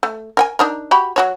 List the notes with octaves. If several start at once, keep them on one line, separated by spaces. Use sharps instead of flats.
A3
A#4 G5 G#5
D4 D#4 A#4
F#4 G4 B5
F#3 F#4 C#5